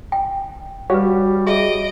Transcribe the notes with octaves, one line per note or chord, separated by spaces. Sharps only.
G5
G3 F#4 G4 B4 C#5 F5
G#4 D#5 E5 D7